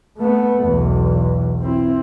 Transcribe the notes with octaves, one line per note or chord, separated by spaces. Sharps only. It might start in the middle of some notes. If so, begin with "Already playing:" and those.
A3 B3
B1 E2
C4 E4